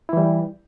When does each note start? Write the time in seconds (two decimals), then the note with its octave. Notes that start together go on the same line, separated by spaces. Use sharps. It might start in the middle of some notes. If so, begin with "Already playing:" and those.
0.09 E4
0.13 E3
0.17 G3